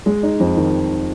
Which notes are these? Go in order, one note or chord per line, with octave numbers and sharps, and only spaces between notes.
G#3
D#4
F2
D#3